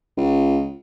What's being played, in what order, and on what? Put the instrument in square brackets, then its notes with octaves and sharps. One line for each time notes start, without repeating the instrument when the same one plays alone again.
[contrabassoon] C#2